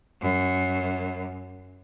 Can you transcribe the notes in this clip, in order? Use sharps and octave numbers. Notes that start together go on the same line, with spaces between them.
F#2